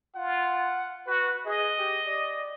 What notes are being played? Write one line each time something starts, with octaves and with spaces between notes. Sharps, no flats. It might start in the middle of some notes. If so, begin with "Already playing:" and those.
F4 F#5
F#4 B4
G#4 D#5
G4
D5